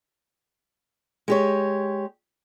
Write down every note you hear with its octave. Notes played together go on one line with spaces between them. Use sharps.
G#3 G4 C#5